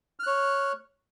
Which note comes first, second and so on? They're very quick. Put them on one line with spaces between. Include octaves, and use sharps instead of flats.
F6 F#6 C#5